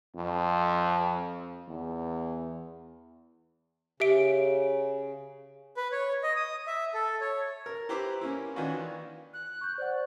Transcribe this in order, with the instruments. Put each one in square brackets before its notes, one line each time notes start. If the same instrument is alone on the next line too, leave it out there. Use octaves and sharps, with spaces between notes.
[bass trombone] F2
E2
[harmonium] C#3 [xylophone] G4 E5 D7
[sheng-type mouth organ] B4
C#5
D#5
D#6
E5
A4
C#5
[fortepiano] A#4
E4 G4 B4 C5 A#5 D6
A#3 C#4 E4
D#3 E3 C#4 D4 F4 F#4
[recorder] F#6
[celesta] C#6 G6
[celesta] C5 F#5 [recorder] D5